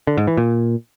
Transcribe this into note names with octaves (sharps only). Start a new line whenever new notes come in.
D3
G#2
E3
A#2